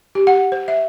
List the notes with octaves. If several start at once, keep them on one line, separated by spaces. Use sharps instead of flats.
G4
F#5
C5
E5